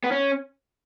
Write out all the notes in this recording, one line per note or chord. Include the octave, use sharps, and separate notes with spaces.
B3
C#4